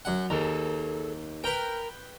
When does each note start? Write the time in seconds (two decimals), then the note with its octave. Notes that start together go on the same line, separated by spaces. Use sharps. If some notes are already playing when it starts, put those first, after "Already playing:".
0.05 F#2 F#5
0.30 D#2 G#4 A4 A#5
1.44 A#4 B4 G5 A#5